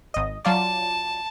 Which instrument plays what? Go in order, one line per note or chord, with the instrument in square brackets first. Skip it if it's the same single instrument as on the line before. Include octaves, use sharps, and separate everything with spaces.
[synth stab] G#1 D#5
[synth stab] F#3 F4 D5 [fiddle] A5